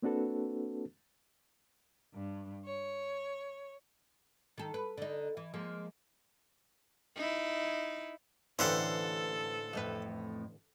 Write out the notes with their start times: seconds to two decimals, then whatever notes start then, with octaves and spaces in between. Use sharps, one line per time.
0.02 A#3 C4 D4 F#4 A4 B4
2.13 G2
2.64 C#5
4.58 D#3 A4
4.74 B4
4.97 D3 D#4
5.37 E3
5.53 F3 G#3 A#3
7.16 D#4 E4
8.59 A1 D3 E3 G4 A4 C5 F5 F#5
9.73 F2 A2 B4